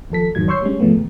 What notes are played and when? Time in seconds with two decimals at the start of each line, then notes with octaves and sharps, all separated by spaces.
0.10 D#2 F3 A4 B6
0.35 F2 G#2 D#3 F#3 G#6
0.48 C#5 C6 C#6 E6 G6 C7
0.62 G3 G#3 C#4
0.80 G#2 C3 F3 G#3 A3 B3
0.96 D#2